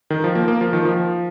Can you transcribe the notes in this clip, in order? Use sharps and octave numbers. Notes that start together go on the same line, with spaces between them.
D#3
F3
A#3
A#3
F3
D#3
F3